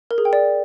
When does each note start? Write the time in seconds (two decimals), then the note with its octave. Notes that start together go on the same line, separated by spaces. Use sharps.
0.11 A#4
0.18 G#4
0.25 G5
0.33 D5